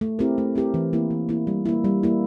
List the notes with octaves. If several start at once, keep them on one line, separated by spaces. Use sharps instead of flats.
A3
C4 E4 G4 A#4
A3
C4 E4 G4 A#4
E3
A#3 E4
E3
A#3 E4
G3
A#3 E4
G3
A#3 E4